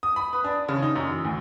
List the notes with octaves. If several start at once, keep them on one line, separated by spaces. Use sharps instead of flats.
D#6
B5
B4
D4
C#3
D#4
F#2
E3
D2